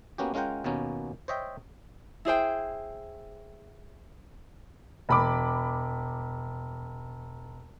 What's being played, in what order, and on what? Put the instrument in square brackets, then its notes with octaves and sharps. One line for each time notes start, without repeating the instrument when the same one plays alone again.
[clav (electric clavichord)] A#3 B3 C#4 F#4 G4
G#3 C#4 F4 A#4 F#5 G5
D#2 B2 A#3 B3 C#4
C5 C#5 D#5 E5 G5
[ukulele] E4 G#4 C5 G5
[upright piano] E1 B5 D6